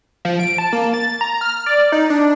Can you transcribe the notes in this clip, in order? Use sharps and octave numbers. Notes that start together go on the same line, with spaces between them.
F3
D7
A5
A#3
A6
A#5
F6
D5
D#4
D4